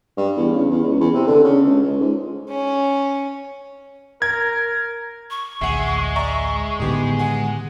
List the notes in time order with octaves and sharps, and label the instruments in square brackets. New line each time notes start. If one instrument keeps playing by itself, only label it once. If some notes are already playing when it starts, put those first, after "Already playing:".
[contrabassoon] G2
E2
C#3
E2
C#2
E2
C3
D3
C#3
C#2
C#2
G#2
[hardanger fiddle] C#4
[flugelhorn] A#4 [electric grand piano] G#6
[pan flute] C#6
[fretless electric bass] A1 D2 [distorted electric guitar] G#3 [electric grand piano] E5 F#5 C7
[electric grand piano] D5 E5 A#5
[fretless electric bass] A2 D3 D#3 [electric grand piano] B3 G4 G#4
[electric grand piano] G#4 F#5 G#5